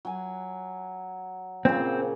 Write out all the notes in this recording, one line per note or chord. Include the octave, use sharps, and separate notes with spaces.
F#3 G#5
A#2 C#3 C4